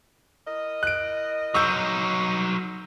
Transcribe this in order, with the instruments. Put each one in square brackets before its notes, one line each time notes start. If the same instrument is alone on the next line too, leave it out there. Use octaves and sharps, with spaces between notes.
[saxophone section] E4 A#4 D#5
[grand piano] F#6 D7
[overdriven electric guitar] F#3 D#4 [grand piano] C#6 E6 G6